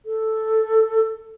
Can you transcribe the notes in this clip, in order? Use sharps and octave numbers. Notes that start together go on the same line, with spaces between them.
A4